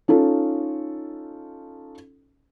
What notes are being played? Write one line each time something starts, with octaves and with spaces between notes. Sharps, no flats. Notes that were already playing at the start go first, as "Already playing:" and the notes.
C#4 D#4 F4 A4